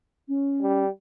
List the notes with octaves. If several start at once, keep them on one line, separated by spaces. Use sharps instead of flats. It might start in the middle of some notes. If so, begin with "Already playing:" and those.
C#4
G3